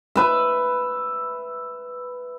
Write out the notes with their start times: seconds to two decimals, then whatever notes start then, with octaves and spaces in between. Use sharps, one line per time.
0.15 B4 E5